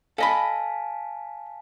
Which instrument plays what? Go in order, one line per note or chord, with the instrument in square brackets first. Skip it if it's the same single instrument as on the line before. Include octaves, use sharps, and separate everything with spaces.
[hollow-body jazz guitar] A4 D#5 B5 [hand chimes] F5 G#5 A5